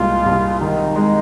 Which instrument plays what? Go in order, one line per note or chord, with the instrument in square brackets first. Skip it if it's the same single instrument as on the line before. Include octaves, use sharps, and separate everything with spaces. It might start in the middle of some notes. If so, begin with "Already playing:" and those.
Already playing: [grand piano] C2 A#2 G#3 [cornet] F4
[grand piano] C2
[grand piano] D#3 [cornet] D#4
[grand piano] G#3